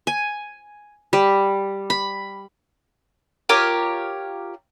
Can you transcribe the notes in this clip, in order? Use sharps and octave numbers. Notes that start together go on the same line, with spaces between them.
G#5
G3
B5
F4 G4 A#4 C#5